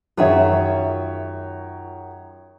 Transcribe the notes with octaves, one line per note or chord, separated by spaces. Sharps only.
F#2 D#3 F4 G#4 C#5 E5